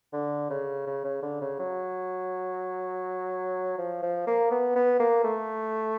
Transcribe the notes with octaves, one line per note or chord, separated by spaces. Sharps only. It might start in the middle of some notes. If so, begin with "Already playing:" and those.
D3
C#3
C#3
C#3
D3
C#3
F#3
F3
F3
A#3
B3
B3
A#3
A3